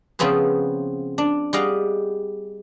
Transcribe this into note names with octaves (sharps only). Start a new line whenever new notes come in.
C#3 F3 B3 C4 G#4 B4
D4
G3 G4 G#4 D#5 F5 F#5